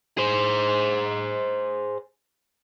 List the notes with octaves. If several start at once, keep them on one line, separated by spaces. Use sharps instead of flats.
G#4 C5